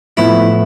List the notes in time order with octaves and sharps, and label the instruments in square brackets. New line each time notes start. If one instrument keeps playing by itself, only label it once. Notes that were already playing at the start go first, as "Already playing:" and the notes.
[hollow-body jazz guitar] A2 F3 B3 [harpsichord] E4